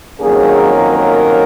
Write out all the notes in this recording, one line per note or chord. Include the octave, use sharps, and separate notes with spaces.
F2 D#3 F#3 A#3 C#4 G#4
A#4